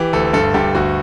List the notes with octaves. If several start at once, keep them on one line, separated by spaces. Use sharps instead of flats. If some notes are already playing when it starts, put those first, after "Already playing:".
Already playing: E3 G4
D2 A4
G2 A4
G2 G4
D2 F#4